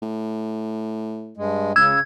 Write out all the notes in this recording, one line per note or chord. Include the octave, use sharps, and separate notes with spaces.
A2
G2 G#3
C#2 C#3 E6 G#6